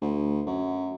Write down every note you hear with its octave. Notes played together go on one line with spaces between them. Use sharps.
D2
F#2